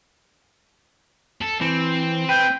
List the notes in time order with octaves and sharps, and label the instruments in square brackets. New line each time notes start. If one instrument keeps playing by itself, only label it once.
[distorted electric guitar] A4
[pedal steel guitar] E3 [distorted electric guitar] C4
[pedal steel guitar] B4 [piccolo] G5